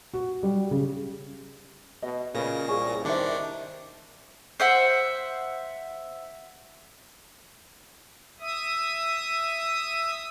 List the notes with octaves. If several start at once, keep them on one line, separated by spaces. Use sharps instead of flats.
F#4
G3
C#3
B2 D#5
A#2 C#3 A#4 B4 A#6
C2 C#4 G#4 C#5 D5 G#5 C#6
D#3 D4 B4 C5 E5 D6 C#7
C5 E5 F#5
E5 D#6